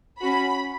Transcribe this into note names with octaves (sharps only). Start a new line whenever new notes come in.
C#4 F#4 B5